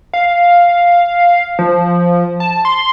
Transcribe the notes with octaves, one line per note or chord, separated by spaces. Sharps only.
F5
F3
A5
C6